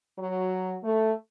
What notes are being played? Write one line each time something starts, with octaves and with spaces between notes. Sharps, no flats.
F#3
A3